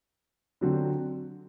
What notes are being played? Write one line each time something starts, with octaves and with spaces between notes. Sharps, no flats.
D3 F#3 C4 F#4